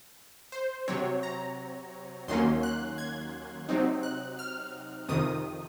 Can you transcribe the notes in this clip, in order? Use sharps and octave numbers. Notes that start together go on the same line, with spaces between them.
C5
C3 F#3 C4 C#5
A#5
D#2 D#3 F#3 A#3 C#4 C6
F#6
G#6
C3 F#3 C4 D#4
F#6
F6
F2 C3 D#3 D#6